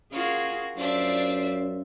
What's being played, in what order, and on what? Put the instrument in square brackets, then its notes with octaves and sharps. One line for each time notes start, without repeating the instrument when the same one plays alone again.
[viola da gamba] C#4 F4 G#4 [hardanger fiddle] F#4 A#4
[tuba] F#2 [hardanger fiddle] D4 E5 [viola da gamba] F4 C5 D5